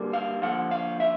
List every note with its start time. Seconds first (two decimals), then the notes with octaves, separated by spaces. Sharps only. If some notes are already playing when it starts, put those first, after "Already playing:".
Already playing: G2 D3 G3 A#3
0.13 F5
0.42 D3 F3 A#3 F#5
0.71 F5
1.00 E5